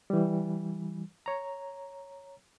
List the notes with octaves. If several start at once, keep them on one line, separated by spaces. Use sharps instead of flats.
E3 G3
C#5 A#5